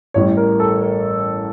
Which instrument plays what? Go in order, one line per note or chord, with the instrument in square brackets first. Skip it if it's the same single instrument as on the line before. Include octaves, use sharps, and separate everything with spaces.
[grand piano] A1 A2 E3 G3 C#5
A#4
A4
A#4